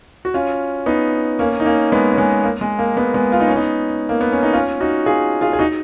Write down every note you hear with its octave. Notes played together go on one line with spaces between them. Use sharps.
F#4
C#4 F4
B3 D#4
A#3 C#4
D#4
A#3 C#4
G#3 B3
C#4
G#3 B3
A#3
G#3
A#3
G#3 B3
G#3 B3
F4
D#4
C#4
B3 D#4
A#3
B3
C#4
D#4
C#4 F4
D#4 F#4
F4 G#4
F4 G#4
G#4
D#4 F#4